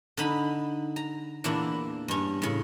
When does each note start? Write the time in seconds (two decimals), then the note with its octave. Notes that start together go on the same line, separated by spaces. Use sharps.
0.17 D3 D#4 B5
0.96 A#5
1.44 E2 A#2 A#3 D4 E4
2.08 G2 C#4
2.42 A2 C#3